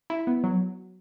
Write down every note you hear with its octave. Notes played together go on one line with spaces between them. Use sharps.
E4
B3
F#3